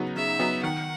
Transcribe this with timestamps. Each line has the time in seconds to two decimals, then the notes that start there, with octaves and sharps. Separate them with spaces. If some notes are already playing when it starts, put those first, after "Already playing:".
Already playing: C#3 F#3 B3 D#4
0.16 C#3 E5
0.40 F#3 B3 D#4
0.63 D#3 F#5